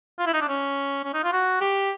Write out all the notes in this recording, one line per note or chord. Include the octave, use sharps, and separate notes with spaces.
F4
E4
D#4
D4
C#4
C#4
D#4
F4
F#4
G4